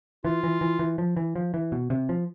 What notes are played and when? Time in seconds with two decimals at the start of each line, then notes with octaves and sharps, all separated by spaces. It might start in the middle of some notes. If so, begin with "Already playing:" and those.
0.25 E3 F4
0.44 E3
0.61 E3
0.79 E3
0.98 F3
1.17 E3
1.36 F3
1.54 E3
1.72 B2
1.90 C3
2.09 F3